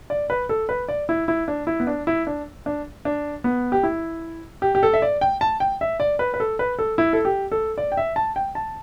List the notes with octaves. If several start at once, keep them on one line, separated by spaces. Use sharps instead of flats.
D5
B4
A4
B4
D5
E4
E4
D4
E4
B3
D4
E4
D4
D4
D4
B3
G4
E4
G4
G4
A4
E5
D5
G5
A5
G5
E5
D5
B4
B4
A4
B4
A4
E4
A4
G4
A4
D5
G5
E5
A5
G5
A5